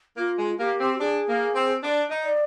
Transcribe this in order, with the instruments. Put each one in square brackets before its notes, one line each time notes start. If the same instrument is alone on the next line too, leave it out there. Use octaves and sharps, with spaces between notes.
[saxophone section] A#3 [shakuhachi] F4
[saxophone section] G#3
[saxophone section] A#3 [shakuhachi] G4
[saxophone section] C4
[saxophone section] D4 [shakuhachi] G#4
[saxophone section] A#3
C4
D4
D#4
[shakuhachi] D5